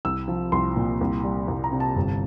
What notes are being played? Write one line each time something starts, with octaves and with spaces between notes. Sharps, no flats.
C2 E6
F3
C2 C6
A#2
C2
G3
C2
A#5
C3
A5
G1